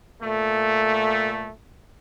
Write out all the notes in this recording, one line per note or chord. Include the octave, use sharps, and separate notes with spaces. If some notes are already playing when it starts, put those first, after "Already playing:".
A#2 A3